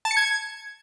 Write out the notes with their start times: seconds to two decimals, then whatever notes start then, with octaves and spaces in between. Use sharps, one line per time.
0.05 A5
0.11 C#7
0.17 G#6